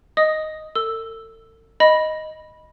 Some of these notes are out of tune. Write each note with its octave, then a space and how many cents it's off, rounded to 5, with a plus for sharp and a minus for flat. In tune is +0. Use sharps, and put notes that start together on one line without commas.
D#5 +0 D#6 +0
A4 +40 E6 +0
D#5 +0 B5 -10